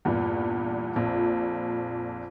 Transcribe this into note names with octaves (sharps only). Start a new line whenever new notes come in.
E2 G2 A#2
A#1 F2 A#2